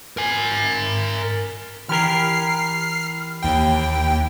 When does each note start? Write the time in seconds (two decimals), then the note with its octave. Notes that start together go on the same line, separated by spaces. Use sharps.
0.17 A#4 G#5
1.89 E3 G4 A#4 F6 C7
3.43 D#2 G5